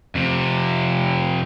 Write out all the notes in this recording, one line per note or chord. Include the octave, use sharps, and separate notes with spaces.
F2 C3